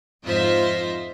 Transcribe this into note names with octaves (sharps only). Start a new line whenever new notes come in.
F2 G#2 F4 C5 D#5 E5